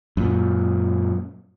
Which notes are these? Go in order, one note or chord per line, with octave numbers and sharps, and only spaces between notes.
F#2 A#2